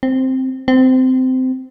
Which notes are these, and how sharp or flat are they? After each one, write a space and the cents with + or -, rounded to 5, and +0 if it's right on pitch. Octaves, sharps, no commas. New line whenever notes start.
C4 +0
C4 -20